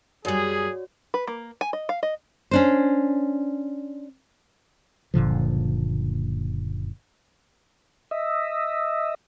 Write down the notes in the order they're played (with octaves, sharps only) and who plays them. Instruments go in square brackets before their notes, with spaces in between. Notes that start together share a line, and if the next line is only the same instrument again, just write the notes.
[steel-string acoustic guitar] F#2 G3 [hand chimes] F#4 C#5 D5 [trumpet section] G#4
[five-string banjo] B4
A#3
G#5
D#5
F5
D#5
[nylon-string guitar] C#4 D4 C5
[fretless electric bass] F#1 A#2 D3 F3
[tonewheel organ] D#5 E5